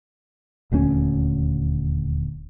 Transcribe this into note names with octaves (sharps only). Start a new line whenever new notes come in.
D#1 D2 G3 C#4